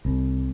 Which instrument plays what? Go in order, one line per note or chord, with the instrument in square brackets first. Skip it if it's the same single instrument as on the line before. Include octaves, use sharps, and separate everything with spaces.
[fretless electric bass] C2